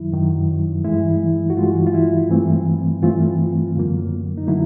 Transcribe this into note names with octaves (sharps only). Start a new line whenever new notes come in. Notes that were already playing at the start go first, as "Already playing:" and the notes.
Already playing: F#2 D#3 F#3 E4
F#2 D#3 F#3
G2 E3 G#3 E4
F#4
G2 E3 G#3 F4
F4
E4
G2 E3 A3 C4
G2 E3 A3 C4 F4
F#2 D3 F#3 A#3
D#4
D3 F#3 A#3 E4